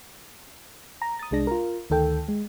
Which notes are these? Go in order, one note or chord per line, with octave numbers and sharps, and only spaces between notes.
A#5
D#6 A6
C2 G#3 D4 A#6
F4 A#4
D2 D#3 A4 G5
G#3